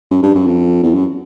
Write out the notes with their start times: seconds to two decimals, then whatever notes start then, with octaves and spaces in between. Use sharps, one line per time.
0.11 F#2
0.23 G2
0.35 F#2
0.47 F2
0.83 E2
0.94 F#2